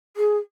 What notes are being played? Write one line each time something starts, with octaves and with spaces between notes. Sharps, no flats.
G#4